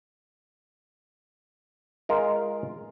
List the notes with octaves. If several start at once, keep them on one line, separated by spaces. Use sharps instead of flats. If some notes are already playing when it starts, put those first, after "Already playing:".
G#3 F4 A#4 F5